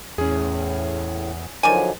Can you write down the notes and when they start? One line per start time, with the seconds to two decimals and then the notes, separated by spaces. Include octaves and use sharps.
0.18 E2 A2 C#4 G#4
1.63 D3 D#3 F3 F#3 D5 G#5